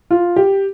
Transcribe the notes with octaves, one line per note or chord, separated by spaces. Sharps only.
F4
G4